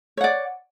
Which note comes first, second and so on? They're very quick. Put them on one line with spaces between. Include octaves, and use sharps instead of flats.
C#5 F#5 D5